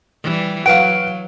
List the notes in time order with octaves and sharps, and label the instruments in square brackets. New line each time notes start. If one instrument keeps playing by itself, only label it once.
[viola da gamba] E3 G3
[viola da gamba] F#3 [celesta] B4 D7 [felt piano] F5 F#5